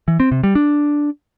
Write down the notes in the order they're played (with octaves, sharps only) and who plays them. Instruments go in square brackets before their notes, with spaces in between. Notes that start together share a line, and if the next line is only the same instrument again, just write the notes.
[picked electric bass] E3
C4
C3
G3
D4